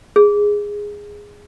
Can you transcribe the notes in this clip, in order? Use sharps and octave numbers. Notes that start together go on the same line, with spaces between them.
G#4